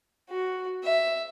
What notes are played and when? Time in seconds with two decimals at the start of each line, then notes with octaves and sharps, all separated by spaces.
0.29 F#4
0.84 E5